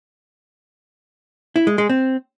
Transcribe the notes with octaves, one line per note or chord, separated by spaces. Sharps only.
E4
G#3
G#3
C4